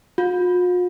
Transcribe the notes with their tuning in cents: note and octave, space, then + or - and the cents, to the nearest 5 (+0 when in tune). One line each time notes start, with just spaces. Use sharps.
F4 +45